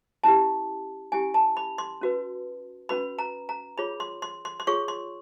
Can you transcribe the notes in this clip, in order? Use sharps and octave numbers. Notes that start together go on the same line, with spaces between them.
C#4 E4 G4 A5
C#4 E4 G4 G#5
A5
B5
C6
C#4 F#4 B4
C#4 F#4 B4 B5
A#5
A#5
F4 G#4 C#5 B5
C6
C6
C6
C6
F4 G#4 C#5 C#6
C6